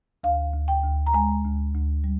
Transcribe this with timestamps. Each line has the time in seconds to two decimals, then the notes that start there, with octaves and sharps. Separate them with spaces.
0.24 D2 F5
0.53 D2
0.68 G5
0.84 D2
1.06 A#5
1.13 G#3 G#5
1.44 D2
1.75 D2
2.04 G3